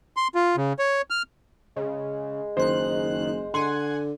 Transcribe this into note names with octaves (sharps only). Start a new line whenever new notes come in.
C6
F4
C#3
C#5
F6
C#3 G#3
F#1 D#3 C5 F#6
D3 F#5 G#5 C6